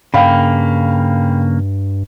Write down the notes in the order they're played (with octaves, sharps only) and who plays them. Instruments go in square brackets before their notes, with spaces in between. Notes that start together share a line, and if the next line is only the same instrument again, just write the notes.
[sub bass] G2 [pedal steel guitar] C#3 A#3 [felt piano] F5 G5 B5